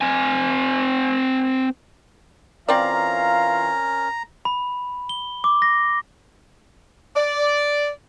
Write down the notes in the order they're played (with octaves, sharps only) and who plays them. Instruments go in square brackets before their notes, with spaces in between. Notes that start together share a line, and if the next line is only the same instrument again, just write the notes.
[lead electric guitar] C4 G#5
[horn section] E3 F4 F5 [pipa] C4 D5 [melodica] C#4 A#4 [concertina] A#5
[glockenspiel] B5
G7
D6
A#6
[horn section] D5